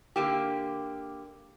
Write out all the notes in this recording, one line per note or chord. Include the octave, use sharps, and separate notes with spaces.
D3 A#3 G4